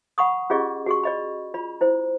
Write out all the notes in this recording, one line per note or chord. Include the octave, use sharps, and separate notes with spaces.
F#5 B5 C#6 D#6
C#4 F4 G4 G#4 D5 D#5
F#4 G#4 C#6
D5 D#5 B5
F4 D5 B5
E4 C5